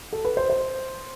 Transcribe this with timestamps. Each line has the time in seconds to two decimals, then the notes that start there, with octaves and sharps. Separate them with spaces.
0.13 A4
0.25 B4
0.37 C5
0.50 C5